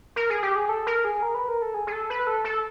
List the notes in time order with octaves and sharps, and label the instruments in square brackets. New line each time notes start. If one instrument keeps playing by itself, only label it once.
[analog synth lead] A#4
G#4
G4
G#4
A4
A#4
G#4
A#4
B4
A#4
A4
G#4
G#4
A4
B4
A4
A4